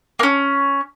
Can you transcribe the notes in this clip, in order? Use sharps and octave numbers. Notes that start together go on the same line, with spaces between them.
A#3 C#4